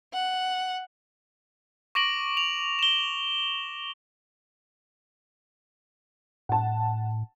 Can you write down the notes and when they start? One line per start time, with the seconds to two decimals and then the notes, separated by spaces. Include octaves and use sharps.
0.14 F#5
1.95 C#6 D6 A#6 D7 F#7
2.37 F7
2.79 E7 G7
6.49 A2 F#5 A5